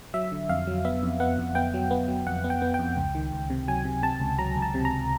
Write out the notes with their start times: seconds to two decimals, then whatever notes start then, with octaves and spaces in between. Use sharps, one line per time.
0.14 F#3 E5
0.32 D3
0.49 F2 F5
0.67 F#3
0.85 B3 E5
1.03 F2
1.20 B3 F#5
1.38 F2
1.55 B3 G5
1.74 F#3
1.91 B3
2.08 F#3
2.27 F2 F#5
2.44 B3
2.50 G5
2.62 B3
2.74 G5
2.79 F2
2.97 C#2
3.15 D#3
3.32 C#2
3.50 C3
3.68 F#3 G#5
3.85 C3
4.03 C3 A5
4.20 C#2
4.39 F#3 A#5
4.56 C#2
4.62 A5
4.74 C3
4.85 A#5
4.91 C#2